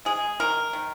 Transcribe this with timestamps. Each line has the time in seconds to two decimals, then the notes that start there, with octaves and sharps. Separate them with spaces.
0.05 G#3 G#4
0.40 D#3 A#4
0.73 D#3